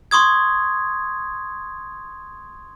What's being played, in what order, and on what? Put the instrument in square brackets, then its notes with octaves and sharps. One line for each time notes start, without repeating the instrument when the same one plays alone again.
[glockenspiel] C6 C#6 D#6 G#6